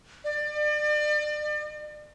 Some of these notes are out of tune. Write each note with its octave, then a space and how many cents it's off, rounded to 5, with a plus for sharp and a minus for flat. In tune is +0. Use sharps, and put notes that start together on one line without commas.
D5 +35